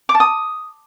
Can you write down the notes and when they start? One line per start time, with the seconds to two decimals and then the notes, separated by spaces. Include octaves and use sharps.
0.09 D6
0.15 A5
0.20 D#6